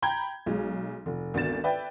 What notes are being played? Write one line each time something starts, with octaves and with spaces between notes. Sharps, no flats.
G5 A#5 B5 G6 G#6
B1 G#3
F1
G#1 D2 B3 A6 E7
B4 D5 E5 G5